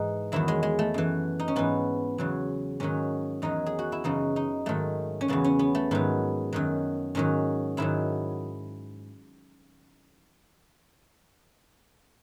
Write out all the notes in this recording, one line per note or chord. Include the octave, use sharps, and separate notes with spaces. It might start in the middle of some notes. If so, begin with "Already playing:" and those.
Already playing: G#2 E3 D#4
E2 D#3 F#3 E4
G#3
G#3
A3
F#2 E3
D#4
C#4
G#2 E3 B3
E2 C#3 F#3
G#2 D#3 F#3 C#4
E2 D#3 F#3 D#4
G#4
F#4
E4
F#2 C#3 E3 D#4
D#4
G#2 D#3 F#3 A3
C#4
E2 C#3 F#3 B3
C#4
B3
A3
G#2 D#3 F#3 B3
F#2 D#3 F#3
G#2 D#3 F#3 C#4
G#2 D#3 F#3 E4